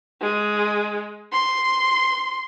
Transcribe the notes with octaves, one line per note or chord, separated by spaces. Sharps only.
G#3
C6